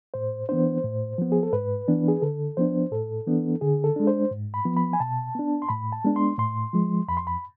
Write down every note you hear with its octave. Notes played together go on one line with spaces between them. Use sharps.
A2 C5
E3 B3 D4 C5
A2
F3 B3
G#4
A4
G#2 B4
E3 B3 D4
G#4
D3 A4
F3 B3 D4 C5
A2 A4
E3 B3 D4
D3 G#4
A4
G#3 D4
C5
G#2
B5
F3 B3
B5
G#5
B2 A5
B3 D4
C6
A2 B5
A5
G#3 B3 D4
C6
A2 C6
F3 G#3
F2 B5
C6
B5